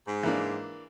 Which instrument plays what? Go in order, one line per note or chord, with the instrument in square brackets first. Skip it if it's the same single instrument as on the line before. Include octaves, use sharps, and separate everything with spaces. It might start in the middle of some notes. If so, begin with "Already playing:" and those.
[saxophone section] G#2
[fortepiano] E3 A#3 D4